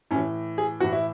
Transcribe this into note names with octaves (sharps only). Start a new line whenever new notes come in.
A2 E3 C#4
G#4
A2 E3 F#4
E4